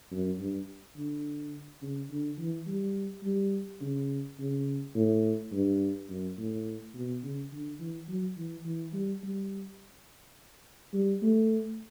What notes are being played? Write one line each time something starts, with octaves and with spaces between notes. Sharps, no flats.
F#2
G2
D3
C#3
D3
E3
G3
G3
C#3
C#3
A2
G2
F#2
A2
B2
C#3
D3
E3
F#3
E3
E3
G3
G3
G3
A3